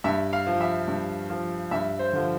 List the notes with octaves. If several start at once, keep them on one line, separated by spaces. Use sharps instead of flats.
G2 E5
F5
F3
E5
G2
F3
G2 E5
C5
D3 F3